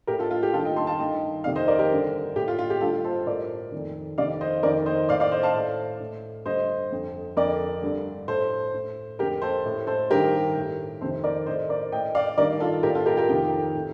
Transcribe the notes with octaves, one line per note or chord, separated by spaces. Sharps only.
A2 G4 A#4
F4 A4
F4
G4
G2 D#3 F4 A4
D#5 G5
A5 C6
F5 A5
G2 D#3 D#5 G5
F2 C3 D#3 D5 F5
C5 D#5
A#4 D5
G4 A#4
G2 D3
A2 G4
F4
F4
G4
G2 D3 F4 A4
A4 C5
A2 A#4 D5
F2 D#3
F2 C3 D#3 D5 F5
C5 D#5
F2 D#3 A#4 D5
C5 D#5
A2 D5 F5
D5 F5
C5 D#5
F5 A5
A2
A2
G2 D3 C5 D#5
F2 D3
F2 D3 A#4 D5
G2 D3
A2 A4 C5
A2
F2 D3 G4 A#4
A4 C5
A2
A4 C5
G2 D#3 G4 A#4
A2
F2 C3 D#3 A4 C5
A#4 D5
A2 C5 D#5
A#4 D5
A2 D#5 G5
D5 F5
G2 D#3 A#4 D5
F4 A4
A2 G4 A#4
F4 A4
G4 A#4
G4 A#4
F2 C3 D#3 G4
A2